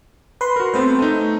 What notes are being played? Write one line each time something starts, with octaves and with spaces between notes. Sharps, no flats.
B4 C6
F#4 A#4
A3 B3 C4 C5
A3 D#4